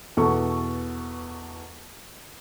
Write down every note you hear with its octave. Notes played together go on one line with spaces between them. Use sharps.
E2 B2 A4 C#6